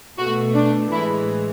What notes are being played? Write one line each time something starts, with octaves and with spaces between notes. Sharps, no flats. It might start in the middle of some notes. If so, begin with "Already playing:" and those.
B2 A3 F#4
D4
A2 E3 G#3 E4